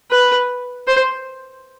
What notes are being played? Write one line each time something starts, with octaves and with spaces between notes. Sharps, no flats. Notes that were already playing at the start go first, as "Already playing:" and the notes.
B4
C5